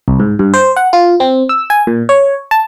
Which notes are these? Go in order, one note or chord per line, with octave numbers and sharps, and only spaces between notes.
C2
G#2
G2
C5
F#5
F4
C4
E6
G#5
A#2
C#5
A5